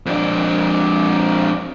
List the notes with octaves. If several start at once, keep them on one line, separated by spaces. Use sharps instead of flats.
F2 D4